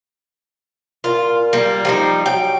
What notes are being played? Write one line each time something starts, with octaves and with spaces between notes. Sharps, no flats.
A#2 F4
G3 A#3
F3 G3 D#4 G4
F#3 G5